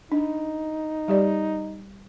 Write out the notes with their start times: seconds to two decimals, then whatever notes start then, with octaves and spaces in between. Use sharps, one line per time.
0.12 D4 D#4
1.08 G3 G4 D5